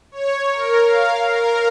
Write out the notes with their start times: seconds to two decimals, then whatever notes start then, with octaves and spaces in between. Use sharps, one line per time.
0.12 C#5
0.52 A#4
0.85 F5
1.28 A#4